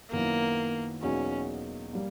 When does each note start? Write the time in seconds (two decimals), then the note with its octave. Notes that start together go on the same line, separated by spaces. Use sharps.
0.12 F#2 D#3 F#3 A#3 B3 E4
1.02 E2 B2 F#3 A#3 C#4 D#4
1.93 G3 A#3